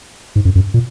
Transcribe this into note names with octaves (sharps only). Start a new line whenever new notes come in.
G#2
F#2
F#2
A#2